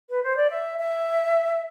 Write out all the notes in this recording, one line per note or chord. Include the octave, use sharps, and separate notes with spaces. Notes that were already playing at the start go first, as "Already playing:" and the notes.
B4
C5
D5
E5
E5